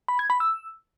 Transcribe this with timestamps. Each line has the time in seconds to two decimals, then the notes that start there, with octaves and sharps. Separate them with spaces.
0.08 B5
0.19 G#6
0.30 B5
0.40 E6